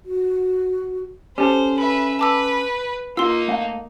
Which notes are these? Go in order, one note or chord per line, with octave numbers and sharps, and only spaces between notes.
F#4
C#4 G4 A4 C5
B4 E5 B5
B4 A5 D6 E6
A#3 D#4 F4 C6 E6
A3 F5